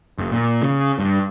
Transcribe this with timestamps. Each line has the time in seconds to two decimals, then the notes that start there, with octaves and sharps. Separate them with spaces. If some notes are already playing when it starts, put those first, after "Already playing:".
0.18 F#1
0.32 A#2
0.63 C#3
0.99 G2